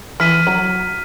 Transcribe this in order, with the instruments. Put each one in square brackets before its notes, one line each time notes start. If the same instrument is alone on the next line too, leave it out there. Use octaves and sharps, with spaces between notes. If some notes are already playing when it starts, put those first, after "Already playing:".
[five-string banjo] E3 [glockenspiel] F6 B6 D#7
[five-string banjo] F#3